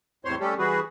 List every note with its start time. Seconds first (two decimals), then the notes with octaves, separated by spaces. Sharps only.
0.25 E2 A2 C3 C5 C#5 C6
0.40 G3 A3 C#4 G4 A4
0.58 E3 G3 F#4 G#4 B4